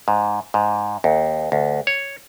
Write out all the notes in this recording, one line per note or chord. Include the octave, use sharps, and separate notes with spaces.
G#2
G#2
D#2
D2
C#5